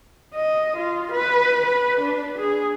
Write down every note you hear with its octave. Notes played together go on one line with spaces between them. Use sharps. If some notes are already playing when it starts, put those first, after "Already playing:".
D#5
F4
B4
B4
D4
G#4